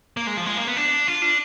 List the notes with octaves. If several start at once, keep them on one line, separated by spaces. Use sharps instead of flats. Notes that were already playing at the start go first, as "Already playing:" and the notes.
A#3
G#3
F3
G#3
A#3
B3
D4
F4
D4